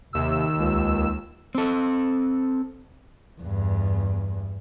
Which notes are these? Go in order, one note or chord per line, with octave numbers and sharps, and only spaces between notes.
D#2 C3 E6
C#2
C4 A4
E2 G2